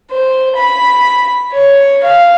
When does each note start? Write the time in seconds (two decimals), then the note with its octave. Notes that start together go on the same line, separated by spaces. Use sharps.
0.11 C5
0.55 B5
1.54 C#5
2.03 F5